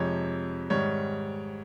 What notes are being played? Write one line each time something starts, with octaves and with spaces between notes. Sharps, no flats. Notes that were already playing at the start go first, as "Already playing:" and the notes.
Already playing: F2 C3 F3 G#3 C#5
G#2 D#3 G3 C#5